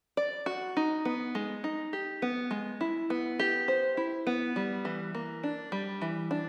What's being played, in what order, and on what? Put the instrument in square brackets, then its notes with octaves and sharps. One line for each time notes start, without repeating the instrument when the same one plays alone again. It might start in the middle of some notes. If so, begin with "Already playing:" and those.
[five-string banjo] D5
F#4
D#4
B3
G#3
D#4
G4
B3
G#3
E4
B3
G4
C5
E4
B3
G3
E3
A#3
D4
G3
E3
D4